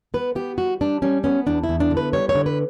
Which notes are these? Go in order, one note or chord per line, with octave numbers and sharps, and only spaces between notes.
B3 B4
B3 G4
G3 F#4
G3 D4
G3 C#4
B3 C#4
E2 D4
E4
E2
D4
D3
B4
G3 C#5
C#5
D3
B4